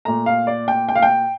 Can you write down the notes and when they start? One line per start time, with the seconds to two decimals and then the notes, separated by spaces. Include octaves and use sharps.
0.05 A#2 A3 A#5
0.26 F5
0.47 D5
0.68 G5
0.88 G5
0.95 F5
1.02 G5